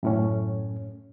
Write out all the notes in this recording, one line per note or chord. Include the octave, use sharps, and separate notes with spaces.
F#2 A2 C#4